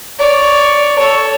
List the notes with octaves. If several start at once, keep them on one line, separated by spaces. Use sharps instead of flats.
C#5 D5
A4 C#5